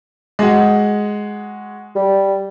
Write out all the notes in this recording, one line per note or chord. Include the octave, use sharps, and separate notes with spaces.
G#3 F#4
G3